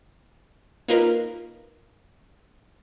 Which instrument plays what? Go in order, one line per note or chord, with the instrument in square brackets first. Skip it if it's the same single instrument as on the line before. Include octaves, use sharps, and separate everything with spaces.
[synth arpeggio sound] A#3 D#4 F4 A#4 B4